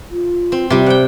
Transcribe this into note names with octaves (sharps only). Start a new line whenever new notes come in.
F4
C4
C3 G3 F4
C5 F#5 G5